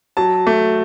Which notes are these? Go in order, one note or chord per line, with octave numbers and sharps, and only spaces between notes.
F#3 A5
A3